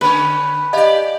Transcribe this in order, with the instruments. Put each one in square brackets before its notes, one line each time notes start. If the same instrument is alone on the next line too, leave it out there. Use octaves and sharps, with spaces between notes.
[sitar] D3 C#4 C#5 [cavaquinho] B4
[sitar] G4 D5 [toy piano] D#5 F5